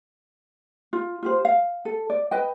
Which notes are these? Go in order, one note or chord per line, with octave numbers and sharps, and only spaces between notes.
F4
F4 G4 C5
F5
A4
D5
B4 D#5 G5